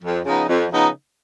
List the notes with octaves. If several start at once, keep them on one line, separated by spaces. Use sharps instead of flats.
F2
C#3 F3 B3 D#4
F2
C#3 F3 B3 D#4